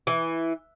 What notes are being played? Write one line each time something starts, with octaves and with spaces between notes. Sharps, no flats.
E3